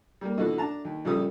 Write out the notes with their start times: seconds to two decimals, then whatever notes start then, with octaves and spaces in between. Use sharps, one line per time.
0.21 G3 A#3
0.38 B2 D3 E3 F3 F#4 A4
0.58 D4 A5 A#5
0.85 D#2
1.05 A#1 C#3 F3 G3 A4 D#6